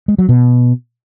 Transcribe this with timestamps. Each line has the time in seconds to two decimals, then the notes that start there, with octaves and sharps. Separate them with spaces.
0.08 G#3
0.18 F#3
0.29 B2